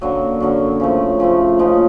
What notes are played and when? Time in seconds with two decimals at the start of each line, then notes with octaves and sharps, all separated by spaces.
0.01 F#2 D3 F#3 A#3
0.40 F#2 D3 F#3 A#3
0.80 C#3 F3 A3
1.20 C#3 F3 A3
1.59 C#3 F3 A#3 D#4